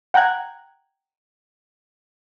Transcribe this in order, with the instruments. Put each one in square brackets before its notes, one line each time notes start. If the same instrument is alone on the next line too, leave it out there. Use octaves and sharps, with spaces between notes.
[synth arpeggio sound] F#5 G5 A#5 F#6 G#6